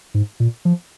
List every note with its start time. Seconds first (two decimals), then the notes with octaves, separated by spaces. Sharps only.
0.14 G#2
0.40 A#2
0.65 F3